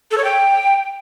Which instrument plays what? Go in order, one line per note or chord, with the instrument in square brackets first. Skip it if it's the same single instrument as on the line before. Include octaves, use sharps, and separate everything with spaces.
[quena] A4
C#5
G5